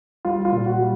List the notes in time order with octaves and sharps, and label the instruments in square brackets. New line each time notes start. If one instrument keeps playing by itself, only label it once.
[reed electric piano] G3 [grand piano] F4
[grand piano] F4
[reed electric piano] A#2
[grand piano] F#4
[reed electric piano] G3